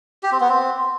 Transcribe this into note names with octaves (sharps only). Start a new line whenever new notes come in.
G4
C4
B3
C4